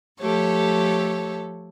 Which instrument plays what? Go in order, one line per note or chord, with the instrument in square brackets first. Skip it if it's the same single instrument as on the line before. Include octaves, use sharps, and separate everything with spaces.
[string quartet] F3 A3 G4 A4 C#5